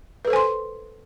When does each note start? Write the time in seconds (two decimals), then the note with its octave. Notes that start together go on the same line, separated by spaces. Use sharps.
0.25 B4
0.27 A4
0.30 C5
0.33 G#5
0.36 C6